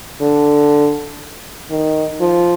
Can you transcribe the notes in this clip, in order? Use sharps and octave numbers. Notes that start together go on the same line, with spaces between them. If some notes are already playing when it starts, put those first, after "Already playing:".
D3
D#3
F3